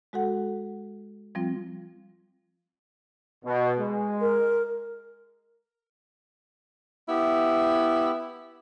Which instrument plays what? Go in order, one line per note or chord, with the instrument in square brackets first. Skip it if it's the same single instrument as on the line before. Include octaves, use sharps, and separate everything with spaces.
[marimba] G#3 F#4 A4 F#5
F3 G3 C4 F4
[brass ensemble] B2
G#3
[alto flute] A#4
[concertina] B3 G4 [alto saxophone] E4